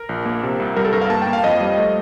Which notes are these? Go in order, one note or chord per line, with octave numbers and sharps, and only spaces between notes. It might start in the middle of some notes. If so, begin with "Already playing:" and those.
Already playing: A#4
A#1
A#3
C3
C2
G3 A#4
A4
G2 A#4
F5
A#3 A5
G5
A#3
F5
F2 D#5
G3
A3